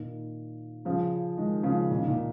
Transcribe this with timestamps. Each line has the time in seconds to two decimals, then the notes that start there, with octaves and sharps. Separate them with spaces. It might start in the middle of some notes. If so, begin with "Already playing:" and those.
Already playing: A#2 D#3
0.85 C#3 F3
1.38 D#3 G#3
1.63 C#3 F3
1.90 A#2 D#3
2.07 A#2 D#3